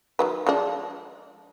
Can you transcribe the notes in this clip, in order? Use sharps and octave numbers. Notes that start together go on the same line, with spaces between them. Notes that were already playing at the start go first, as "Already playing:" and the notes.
D#3 F#3 B4
F3 G#3 D4